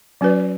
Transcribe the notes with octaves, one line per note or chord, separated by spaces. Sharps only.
F#3 C#4 F#4 B4 D5